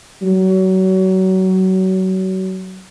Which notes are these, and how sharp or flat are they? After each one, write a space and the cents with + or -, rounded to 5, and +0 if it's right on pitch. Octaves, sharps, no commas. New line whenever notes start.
F#3 +30